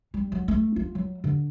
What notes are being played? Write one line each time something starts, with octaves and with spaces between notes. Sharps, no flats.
G3
F#3
A3
F4
F#3
D3